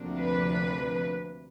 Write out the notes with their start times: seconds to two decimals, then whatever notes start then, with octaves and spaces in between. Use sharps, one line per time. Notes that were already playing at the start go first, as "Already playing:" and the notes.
Already playing: D2 C3 F3 A#3 D4
0.18 B4